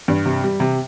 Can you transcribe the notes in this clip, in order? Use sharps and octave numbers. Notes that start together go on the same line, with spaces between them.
G2
C3
G3
C3